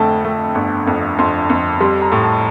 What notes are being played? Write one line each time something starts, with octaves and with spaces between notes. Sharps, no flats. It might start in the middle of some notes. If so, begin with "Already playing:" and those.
Already playing: F2 D3 A3 G5 A5
A3
G1
F2
F2 C6
F2
G3 C6
A#5
A2
A5